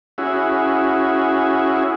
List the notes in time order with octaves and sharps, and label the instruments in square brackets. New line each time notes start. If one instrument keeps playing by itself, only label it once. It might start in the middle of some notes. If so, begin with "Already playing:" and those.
[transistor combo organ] C#4 E4 F#4 G#4